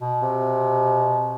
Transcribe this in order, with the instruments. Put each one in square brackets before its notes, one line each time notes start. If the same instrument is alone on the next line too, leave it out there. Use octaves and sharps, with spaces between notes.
[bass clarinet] B2
[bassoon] C3